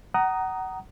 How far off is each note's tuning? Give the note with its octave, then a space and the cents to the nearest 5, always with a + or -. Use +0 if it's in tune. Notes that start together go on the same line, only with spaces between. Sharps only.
F#5 +30 A#5 +0 D#6 +0